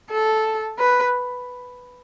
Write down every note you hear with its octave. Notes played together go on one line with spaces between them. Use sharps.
A4
B4